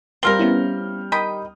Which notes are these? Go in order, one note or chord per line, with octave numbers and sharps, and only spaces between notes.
G3 C4 F4 A#4 F6 G7
B3 C#4 E4
D#3 G5 B5 D#6